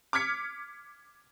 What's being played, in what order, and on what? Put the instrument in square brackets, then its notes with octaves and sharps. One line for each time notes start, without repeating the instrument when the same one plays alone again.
[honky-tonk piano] D6 F6 G#6 B6 C#7